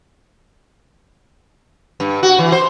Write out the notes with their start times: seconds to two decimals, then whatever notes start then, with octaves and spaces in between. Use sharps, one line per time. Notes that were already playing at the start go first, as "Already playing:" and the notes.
2.00 G2
2.23 F#4
2.39 E3
2.52 C5